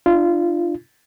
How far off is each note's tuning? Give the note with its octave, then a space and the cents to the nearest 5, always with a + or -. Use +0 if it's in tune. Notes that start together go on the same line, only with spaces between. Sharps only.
D4 +30 F4 -20